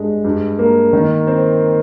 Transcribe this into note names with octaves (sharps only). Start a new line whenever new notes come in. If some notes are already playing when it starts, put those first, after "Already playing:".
Already playing: G2 G#3 D4
G2
A#3
D#3
C4